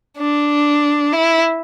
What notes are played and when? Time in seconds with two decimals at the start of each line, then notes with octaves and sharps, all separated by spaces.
0.18 D4
1.13 E4